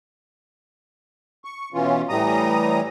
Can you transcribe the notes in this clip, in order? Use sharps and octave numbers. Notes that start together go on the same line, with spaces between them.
C#6
B2 E3 C#4 F4
A2 E3 G3 A#5 D#6